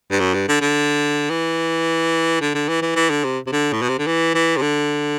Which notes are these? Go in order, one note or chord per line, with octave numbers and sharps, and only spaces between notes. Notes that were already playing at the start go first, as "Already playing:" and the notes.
G2
F#2
G2
D3
D3
E3
D3
D3
E3
E3
E3
D3
C3
C3
D3
A2
B2
C3
D3
E3
E3
C3
D3